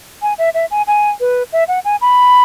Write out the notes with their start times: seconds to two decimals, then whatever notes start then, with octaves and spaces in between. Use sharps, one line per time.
0.22 G#5
0.38 E5
0.54 E5
0.71 G#5
0.87 G#5
1.20 B4
1.53 E5
1.68 F#5
1.85 G#5
2.01 B5